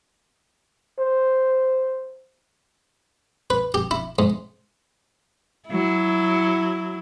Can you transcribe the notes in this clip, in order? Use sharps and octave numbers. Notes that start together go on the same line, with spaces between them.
C5
B4
G4
E4
G#2
F#3 E4